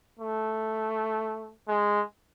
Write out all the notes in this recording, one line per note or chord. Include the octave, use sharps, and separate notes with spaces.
A3
G#3